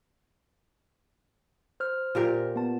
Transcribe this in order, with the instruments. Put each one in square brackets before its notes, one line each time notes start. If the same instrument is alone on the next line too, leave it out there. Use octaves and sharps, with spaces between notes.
[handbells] C5 F6
[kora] A#2 G4 A#4
[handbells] B3 A5